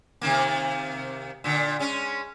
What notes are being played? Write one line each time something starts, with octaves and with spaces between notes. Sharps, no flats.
C3 D#3 A#3
A#2 D3
G#3 C#4